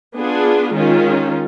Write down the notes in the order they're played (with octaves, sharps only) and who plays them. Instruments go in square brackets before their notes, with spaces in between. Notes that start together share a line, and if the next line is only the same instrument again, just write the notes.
[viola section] B3 D4 F4 G#4
D#3 G#3 C#4 F4